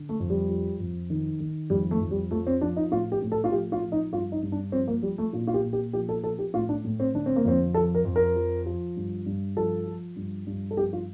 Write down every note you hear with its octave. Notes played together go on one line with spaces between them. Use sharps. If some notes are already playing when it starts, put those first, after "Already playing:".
Already playing: D3
A3
F2
G3
F3
F2
D#3
D#3
F2 G3
A3
F2
G3
F3 A3
C4
F3 D4
D#4
A2 F4
G4
A2
A4
F4
F3 G4
F4
F3
D#4
G2 F4
D#4
G2
D4
F3 C4
A#3
F3 G3
A3
A#2 F4
F4
G4
A#2
G4
F3 G4
A4
F3 A4
G4
A2 F4
D4
A2
C4
D3 D4
C4
A#3
F2 C4
F3 A4
A#4
F2
A#4
F3
F3
G2
G2
F3 A4
F3
G2
G2
A4
F3 G4
F4